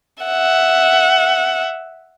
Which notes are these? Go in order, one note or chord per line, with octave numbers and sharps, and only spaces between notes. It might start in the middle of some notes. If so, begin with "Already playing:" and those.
E5 F#5